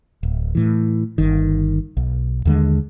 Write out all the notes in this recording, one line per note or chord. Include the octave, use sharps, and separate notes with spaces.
D1
A2 E3
G1 D#3
B1
D#2 D3 G#3